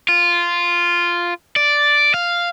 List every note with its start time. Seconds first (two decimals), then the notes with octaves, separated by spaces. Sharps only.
0.08 F4
1.56 D5
2.14 F5